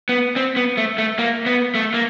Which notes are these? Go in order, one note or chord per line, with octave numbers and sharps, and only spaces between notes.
B3
C4
B3
A3
A3
A#3
B3
A3
A#3